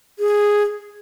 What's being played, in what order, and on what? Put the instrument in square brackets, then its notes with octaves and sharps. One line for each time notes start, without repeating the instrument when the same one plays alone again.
[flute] G#4